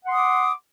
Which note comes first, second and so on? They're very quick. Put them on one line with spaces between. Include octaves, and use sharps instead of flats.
F#5 C6 D#6 D6